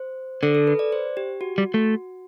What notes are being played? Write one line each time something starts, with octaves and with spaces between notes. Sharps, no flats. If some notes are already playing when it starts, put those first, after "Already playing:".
Already playing: C5
D3 A4
A4
B4
D5
C5
G4
F#4
G3
A3